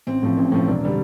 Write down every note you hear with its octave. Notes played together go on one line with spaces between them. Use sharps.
A1 C4
A2 F3
A1
A2 F3
E1 D4
D3 G3